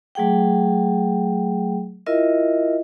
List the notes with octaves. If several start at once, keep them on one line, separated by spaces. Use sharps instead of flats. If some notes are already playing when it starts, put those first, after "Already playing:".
F#3 A3 G#4 F#5 G5
E4 F4 A#4 D#5 E5